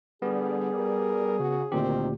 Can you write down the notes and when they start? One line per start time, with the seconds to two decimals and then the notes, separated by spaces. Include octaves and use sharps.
0.22 D3 G3 B3 G#4
0.74 A#4
1.40 C#3 F#4
1.72 D2 A#2 D#3 C4 G4